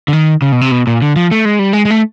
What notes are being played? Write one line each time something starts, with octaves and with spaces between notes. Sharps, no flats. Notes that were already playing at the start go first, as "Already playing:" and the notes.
D3
D#3
C#3
B2
C3
B2
A#2
D3
F3
A3
G#3
G3
G#3
G#3
A3